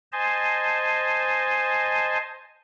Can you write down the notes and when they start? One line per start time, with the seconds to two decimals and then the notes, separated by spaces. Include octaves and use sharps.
0.12 C5 D#5 G#5 A5